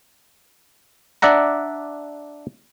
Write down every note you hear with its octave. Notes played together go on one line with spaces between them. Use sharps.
D4 D5 E5 F#5 A#5